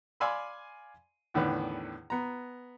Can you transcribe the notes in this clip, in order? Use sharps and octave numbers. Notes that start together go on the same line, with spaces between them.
D5 F5 G#5 B5 C6 E6
E2 A2 D3 D#3 B4
B3 A#5